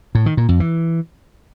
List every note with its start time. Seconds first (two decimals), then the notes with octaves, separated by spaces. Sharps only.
0.15 A2
0.26 D#3
0.37 A#2
0.49 F2
0.60 E3